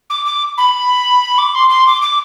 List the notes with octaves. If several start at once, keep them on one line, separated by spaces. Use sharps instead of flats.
D6
D6
B5
D6
C6
C6
D6
D6